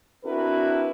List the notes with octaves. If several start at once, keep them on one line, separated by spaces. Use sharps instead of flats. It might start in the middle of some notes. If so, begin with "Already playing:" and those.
C4 D4 E4 F#4 A#4 B4